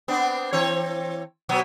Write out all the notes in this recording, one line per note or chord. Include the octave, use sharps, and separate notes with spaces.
B3 C4 D4
E3 C4 C#5
B2 F#3 B3